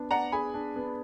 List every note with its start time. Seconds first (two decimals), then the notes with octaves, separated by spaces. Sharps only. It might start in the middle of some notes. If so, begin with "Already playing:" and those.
Already playing: B3 D4
0.11 D5 F#5 A#5
0.32 G#4 G#5 B5
0.54 D4
0.76 B3